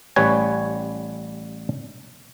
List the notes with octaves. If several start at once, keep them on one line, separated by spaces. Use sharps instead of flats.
A1 G3 B4 C#5 G#5